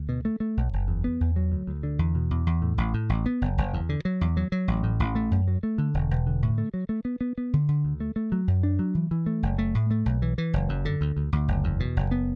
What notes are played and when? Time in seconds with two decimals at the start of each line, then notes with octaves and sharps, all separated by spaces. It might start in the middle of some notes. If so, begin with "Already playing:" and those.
Already playing: D2
0.09 B2
0.25 A3
0.40 A3
0.57 B1
0.73 F#1
0.88 E2
1.04 B3
1.20 E2
1.36 F#3
1.52 D2
1.67 D2
1.83 D3
1.99 E2
2.15 B2
2.31 E2
2.47 E2
2.62 A2
2.78 A1
2.94 A2
3.09 A1
3.26 B3
3.41 F#1
3.58 F#1
3.73 E2
3.89 D3
4.05 F#3
4.21 E2
4.37 F#3
4.52 F#3
4.68 A1
4.83 A2
5.00 A1
5.15 A3
5.31 F#2
5.48 F#3
5.63 A3
5.78 D3
5.94 E1
6.11 E1
6.27 D3
6.42 A2
6.58 A3
6.74 F#3
6.89 A3
7.05 B3
7.21 B3
7.38 B3
7.53 D3
7.69 D3
7.85 D2
8.00 A3
8.16 A3
8.32 F#3
8.48 F#2
8.63 D4
8.79 F#3
8.95 E3
9.11 E3
9.26 A3
9.43 F#1
9.58 A3
9.75 A2
9.91 A3
10.06 B1
10.22 E3
10.38 E3
10.53 F#1
10.69 F#2
10.85 D3
11.01 D2
11.17 D2
11.32 D2
11.48 F#1
11.64 E2
11.80 B2
11.97 F#1
12.11 B3